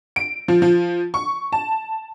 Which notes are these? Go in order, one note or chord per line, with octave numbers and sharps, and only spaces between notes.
D7
F3
F3
C#6
A5